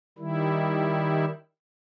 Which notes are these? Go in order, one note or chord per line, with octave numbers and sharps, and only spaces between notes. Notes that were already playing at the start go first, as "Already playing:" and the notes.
D#3 G3 E4